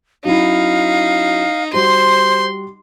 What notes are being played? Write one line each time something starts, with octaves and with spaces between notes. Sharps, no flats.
F#3 C#4 D#4 E4 F5
G3 F#4 G4 C5 C6